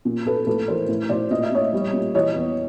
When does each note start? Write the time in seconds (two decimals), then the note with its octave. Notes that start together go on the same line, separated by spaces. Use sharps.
0.05 A#2
0.26 A#2 A4 B4
0.47 A2 A4 B4
0.68 E3 A#4 C5
0.88 A2
1.09 A2 C5 D5
1.30 A#2 D#5
1.43 E5
1.52 A#2 C#5 D#5
1.73 G3
1.93 A#2
2.14 E3 C#5 D#5
2.36 E2